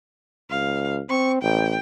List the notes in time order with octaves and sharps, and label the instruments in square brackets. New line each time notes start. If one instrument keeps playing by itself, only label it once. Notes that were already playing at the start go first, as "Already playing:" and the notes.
[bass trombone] C#2 [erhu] F5
[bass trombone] C4 [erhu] C#6
[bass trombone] A1 [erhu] G5